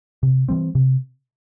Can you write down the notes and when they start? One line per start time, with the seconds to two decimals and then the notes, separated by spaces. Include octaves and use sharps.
0.23 C3
0.49 E3 G3 C4
0.75 C3